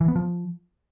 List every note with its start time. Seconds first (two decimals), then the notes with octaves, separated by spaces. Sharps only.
0.01 E3
0.08 B3
0.16 F3